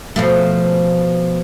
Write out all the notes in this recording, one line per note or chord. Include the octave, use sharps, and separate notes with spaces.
B2 F3 A3